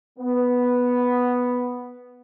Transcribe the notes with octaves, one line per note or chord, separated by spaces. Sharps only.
B3